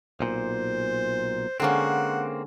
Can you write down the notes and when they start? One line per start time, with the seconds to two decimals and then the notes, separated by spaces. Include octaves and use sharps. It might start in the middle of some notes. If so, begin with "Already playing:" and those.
0.20 B1 A#2 C5
1.60 D3 G#3 A#3 C4 C#4 F#5